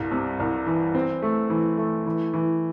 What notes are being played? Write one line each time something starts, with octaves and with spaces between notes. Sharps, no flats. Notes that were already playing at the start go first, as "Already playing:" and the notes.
Already playing: C2 G2
C3
C2
E3
C4
A3
E3
A3
E3
E3